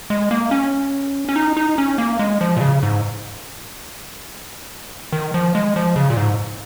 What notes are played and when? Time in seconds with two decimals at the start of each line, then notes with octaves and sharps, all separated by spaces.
0.10 G#3
0.31 A#3
0.51 C#4
1.29 C#4
1.36 D#4
1.57 D#4
1.78 C#4
1.98 A#3
2.19 G#3
2.41 F3
2.57 A#2
2.61 C#3
2.83 G#2
5.13 D#3
5.34 F3
5.55 G#3
5.76 F3
5.96 C#3
6.10 A#2
6.17 G#2